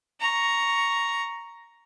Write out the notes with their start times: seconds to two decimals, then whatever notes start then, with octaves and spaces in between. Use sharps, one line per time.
0.21 A#5 C#6